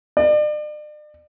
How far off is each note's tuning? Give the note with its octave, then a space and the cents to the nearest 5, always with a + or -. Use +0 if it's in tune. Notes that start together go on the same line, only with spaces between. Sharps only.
D5 +40